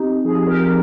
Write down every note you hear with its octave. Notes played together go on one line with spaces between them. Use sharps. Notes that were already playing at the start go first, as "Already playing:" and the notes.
Already playing: C4 D#4 G4
F3 G#4
G4 A#4